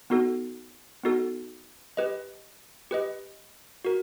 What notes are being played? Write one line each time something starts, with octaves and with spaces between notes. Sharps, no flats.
B3 D#4 F#4 A4
B3 D#4 F#4 A4
G4 B4 D#5
G4 B4 D#5
F#4 A#4